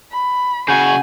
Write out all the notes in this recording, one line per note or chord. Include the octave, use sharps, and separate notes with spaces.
B5
C#3 F#4 F#5 G#5 G6